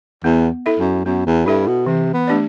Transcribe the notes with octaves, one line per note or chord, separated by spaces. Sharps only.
E2 B3
E4 A4 E5
F#2
F#2 B3
E2
G2 E4 A4 E5
B2
C3 E3
B3
A3 D4 G4 D5